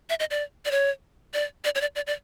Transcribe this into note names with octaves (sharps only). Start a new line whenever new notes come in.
E5
D#5
D5
D5
C#5
D5
D5
C#5
D5
D5
D5